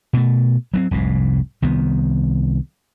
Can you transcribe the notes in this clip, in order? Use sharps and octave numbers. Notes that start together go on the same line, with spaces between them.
B2 A3
F#3 A#3 C4
F1 C2 G#2
C2 D#3 B3